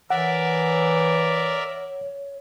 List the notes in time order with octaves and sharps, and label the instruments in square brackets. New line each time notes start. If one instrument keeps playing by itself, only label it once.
[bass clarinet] E3 [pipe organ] A#4 D5 E5 [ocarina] C#5 [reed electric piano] F#5